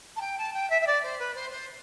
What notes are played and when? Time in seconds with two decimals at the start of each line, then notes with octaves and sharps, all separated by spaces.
0.16 A5
0.21 G5
0.38 A5
0.54 G5
0.70 E5
0.82 E5
0.87 D5
1.03 C5
1.19 B4
1.35 C5
1.51 C5